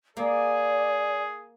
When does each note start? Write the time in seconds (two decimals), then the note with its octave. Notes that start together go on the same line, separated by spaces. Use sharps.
0.17 A#3 G#4 D5